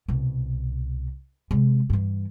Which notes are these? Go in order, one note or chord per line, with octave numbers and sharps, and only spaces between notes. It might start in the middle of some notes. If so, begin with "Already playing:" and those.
C2 B2
C3 G#3
G2 E3